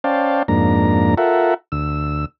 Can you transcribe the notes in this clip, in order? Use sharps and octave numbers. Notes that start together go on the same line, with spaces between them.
C#4 C5 D5 F5 G5 A5
F2 G#2 A#3 D4 A#5
F4 A4 A#4 E5 F#5
D2 E6